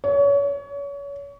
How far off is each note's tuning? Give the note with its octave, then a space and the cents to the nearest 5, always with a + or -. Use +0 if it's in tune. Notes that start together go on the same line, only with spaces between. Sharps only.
C#5 +30